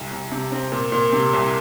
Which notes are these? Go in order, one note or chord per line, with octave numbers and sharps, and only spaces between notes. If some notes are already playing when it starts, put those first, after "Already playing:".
Already playing: C2
C2
C3
C4
A#2
A#2
C3
C2